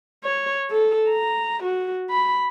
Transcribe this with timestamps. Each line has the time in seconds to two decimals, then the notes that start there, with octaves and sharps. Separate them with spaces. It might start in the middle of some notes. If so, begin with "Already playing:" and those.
0.24 C#5
0.70 A4
1.09 A#5
1.63 F#4
2.10 B5